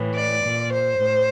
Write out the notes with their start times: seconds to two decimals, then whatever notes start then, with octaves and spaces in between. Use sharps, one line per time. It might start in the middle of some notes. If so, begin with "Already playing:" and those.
Already playing: A2 E3
0.15 D5
0.43 A#2
0.71 C5
0.99 A2